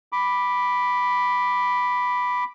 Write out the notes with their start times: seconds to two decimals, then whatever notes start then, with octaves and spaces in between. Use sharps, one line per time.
0.12 B5 D6